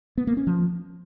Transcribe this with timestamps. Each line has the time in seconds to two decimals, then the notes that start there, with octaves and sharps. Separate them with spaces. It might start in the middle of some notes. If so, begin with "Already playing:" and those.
0.18 B3
0.27 A#3
0.37 C#4
0.47 F3